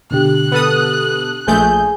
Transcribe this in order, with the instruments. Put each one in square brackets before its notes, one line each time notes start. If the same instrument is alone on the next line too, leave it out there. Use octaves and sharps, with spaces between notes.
[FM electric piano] B2 D3 G4 [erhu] F#6
[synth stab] B3 A4 D#6
[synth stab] A#1 A3 G6 [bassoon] G#4